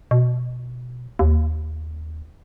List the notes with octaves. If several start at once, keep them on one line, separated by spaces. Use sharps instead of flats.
B2
D#2